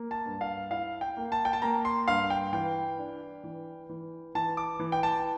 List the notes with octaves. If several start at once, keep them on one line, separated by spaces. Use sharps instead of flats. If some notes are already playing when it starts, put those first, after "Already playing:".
Already playing: A#3
A5
G2
F5
E4 F5
G5
A#3
A5
G5
A5
A#3 A#5
C6
G2 F5
G5
E3 G5
D4
E3
E3
E3 A5
D6
E3
G5
A5